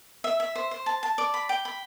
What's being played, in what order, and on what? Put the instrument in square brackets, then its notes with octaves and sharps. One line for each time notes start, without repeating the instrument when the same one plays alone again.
[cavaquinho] E5
E5
C5
C5
A5
A5
D5
B5
G5
B5